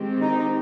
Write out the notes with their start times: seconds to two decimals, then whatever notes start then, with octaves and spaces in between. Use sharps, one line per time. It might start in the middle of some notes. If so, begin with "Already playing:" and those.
Already playing: D#3 G#3 C4 G4
0.21 D#4